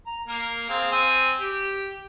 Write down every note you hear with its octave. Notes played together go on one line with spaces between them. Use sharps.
A#5
A#3 A#4
C4 G#4 F5
C4 G#5
G4